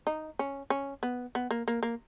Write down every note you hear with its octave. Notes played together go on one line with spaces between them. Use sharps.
D#4
C#4
C#4
B3
B3
A#3
A#3
A#3